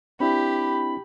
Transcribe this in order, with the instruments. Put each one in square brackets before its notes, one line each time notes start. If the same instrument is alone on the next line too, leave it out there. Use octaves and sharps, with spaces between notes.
[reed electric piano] C4 D4 E4 [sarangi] G4 [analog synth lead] B5